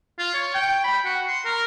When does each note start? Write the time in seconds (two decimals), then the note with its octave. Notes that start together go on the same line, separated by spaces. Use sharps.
0.19 F4
0.34 C#5
0.55 G5
0.84 B5
1.05 F#4
1.28 C6
1.45 A#4